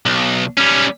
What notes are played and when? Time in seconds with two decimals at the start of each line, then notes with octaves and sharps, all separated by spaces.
0.06 B1
0.57 G3 C#4